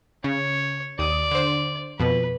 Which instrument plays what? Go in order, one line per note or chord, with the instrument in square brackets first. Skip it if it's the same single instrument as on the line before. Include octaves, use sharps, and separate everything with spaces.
[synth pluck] C#3 [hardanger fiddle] C#5
[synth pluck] D#2 D#6 [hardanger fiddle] D5
[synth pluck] D3 C5
[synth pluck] F2 B2 [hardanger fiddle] B4